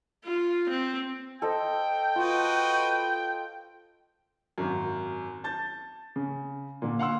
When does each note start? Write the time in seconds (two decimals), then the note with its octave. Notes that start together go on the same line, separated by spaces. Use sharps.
0.24 F4
0.70 C4
1.42 A4 C5 D#5 G5
2.16 F4 F#4 B4 D#5
4.58 G#1 F#2
5.44 A5 G6 A6
6.16 C#3
6.82 A#2 D3
6.99 F5 F#5 C6 E6